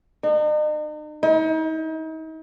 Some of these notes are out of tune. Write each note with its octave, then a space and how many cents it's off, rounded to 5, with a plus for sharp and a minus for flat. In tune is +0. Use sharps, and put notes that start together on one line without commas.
D#4 -40
D#4 +40